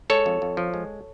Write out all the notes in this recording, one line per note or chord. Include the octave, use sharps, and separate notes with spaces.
G#3 A4 C#5
F2
F2
F3
G#3